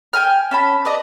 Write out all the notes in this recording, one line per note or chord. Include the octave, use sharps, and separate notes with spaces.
G5 G#5 A#5 F6
C#4 A5 B5
B4 D5 D#5 A#5